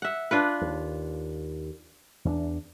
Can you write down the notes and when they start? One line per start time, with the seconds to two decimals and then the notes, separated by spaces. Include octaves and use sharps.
0.02 E5 F#5
0.31 D4 F4 B4
0.61 D#2
2.25 E2 C#4 D4